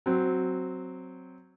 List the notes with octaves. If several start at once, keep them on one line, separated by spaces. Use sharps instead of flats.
F#3 C4